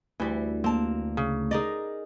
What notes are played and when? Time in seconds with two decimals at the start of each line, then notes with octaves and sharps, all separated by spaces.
0.20 D2 E3 G3 E4
0.64 A#3 C4 A5
1.17 C#3
1.51 D#4 G#4 A#4 D5 D#5